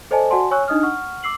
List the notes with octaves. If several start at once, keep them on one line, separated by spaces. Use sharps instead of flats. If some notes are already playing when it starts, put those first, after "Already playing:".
A4 C5 D5 D#5 G#5 A5
F#4 D5 F#5 G#5 A5 C6
C#5 G#5 C#6 E6 F#6
D4 D#4 D#5 D#6 F6
F#5 C#6 F6
D6 E6 C7 F#7